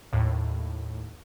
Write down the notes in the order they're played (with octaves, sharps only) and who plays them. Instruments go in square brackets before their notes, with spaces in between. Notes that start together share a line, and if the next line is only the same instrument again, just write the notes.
[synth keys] D#2 A2